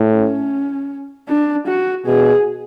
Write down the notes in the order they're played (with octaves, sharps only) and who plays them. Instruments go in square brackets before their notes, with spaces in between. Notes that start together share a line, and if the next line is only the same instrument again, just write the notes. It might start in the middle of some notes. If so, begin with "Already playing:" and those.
Already playing: [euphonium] A2
[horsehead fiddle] C#4
D4
F#4
[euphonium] B2 [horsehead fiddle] G#4